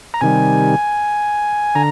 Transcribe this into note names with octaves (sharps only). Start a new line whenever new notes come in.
A#5
C3 D#3 G3 G#5
D3 A#5